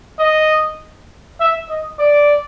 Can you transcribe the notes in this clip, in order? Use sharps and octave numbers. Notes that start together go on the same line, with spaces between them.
D#5
E5
D#5
D5